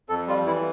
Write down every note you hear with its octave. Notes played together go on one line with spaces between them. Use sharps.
F2 A4
G3 F4
E3 E4